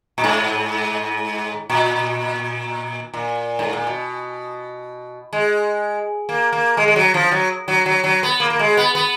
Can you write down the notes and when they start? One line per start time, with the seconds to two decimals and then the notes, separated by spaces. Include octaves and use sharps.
0.18 A#2
0.24 G#2
1.70 A#2
3.14 A#2
3.59 G#2
3.73 A#2
3.87 B2
5.33 G#3
6.29 A#3
6.52 A#3
6.77 G#3
6.88 G#3
6.96 F#3
7.14 F3
7.31 F#3
7.68 F#3
7.86 F#3
8.04 F#3
8.23 B3
8.40 A#3
8.50 A#3
8.59 G#3
8.77 B3
8.95 B3